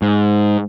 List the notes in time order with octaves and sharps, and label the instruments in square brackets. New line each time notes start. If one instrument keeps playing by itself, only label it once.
[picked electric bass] G#2